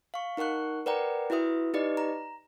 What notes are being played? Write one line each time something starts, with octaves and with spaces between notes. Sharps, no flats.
F5 C#6
D#4 A#4 F#5 C#6 F#6
A#4 B4 D5 F#5 G5 A#5
E4 F#4 B4 E5 D#6
D#4 G4 B4 D5 D#5
A#5